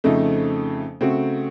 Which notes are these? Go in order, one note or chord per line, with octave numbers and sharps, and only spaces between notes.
F2 C#3 F3 A3 D#4
C#3 A3 C4 F#4